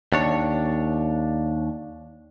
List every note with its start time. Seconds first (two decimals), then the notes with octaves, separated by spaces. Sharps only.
0.12 D#2 D4 C#5